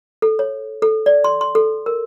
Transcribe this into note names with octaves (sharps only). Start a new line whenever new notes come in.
A4
C#5
A4
D5
C6
C6
A4
A#4